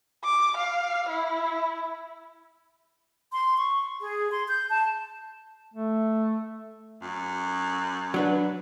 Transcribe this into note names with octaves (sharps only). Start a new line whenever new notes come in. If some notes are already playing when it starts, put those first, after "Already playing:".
D6
F5
E4
C6
C#6
G#4
C6
G6
A5
A3
F#2
F#3 D4 B4